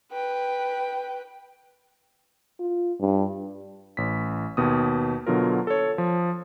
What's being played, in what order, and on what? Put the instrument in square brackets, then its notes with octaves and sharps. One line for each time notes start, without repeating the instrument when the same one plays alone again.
[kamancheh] B4 G5
[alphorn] F4
G2
[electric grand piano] A1 B6
D#2 B2 D#6
B2 D3 F#3 F4 A#4
A4 C#5
F3